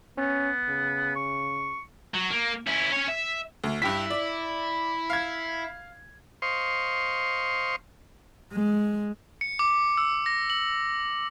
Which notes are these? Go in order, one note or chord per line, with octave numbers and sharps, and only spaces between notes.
B3 C#4
C#3
C#6
F#3
A#3
C#4 E4
C#4 C#5
E5
D2
G2 E4 G4 B6
D5
F5 G#6
C5 D#5 F5 C6 C#6
G#3
C#7
D6
E6
A#6
F#7